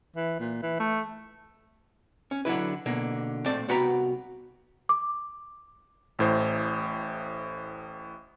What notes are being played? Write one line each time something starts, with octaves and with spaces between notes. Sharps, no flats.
E3
A#2
E3
A3
C#4
D3 F#3 E4 B4
B2 D3 A#3
A#2 A3 C4 D5
C2 B3 F#4 B4 G5 A#5
D6
A1 A2 C5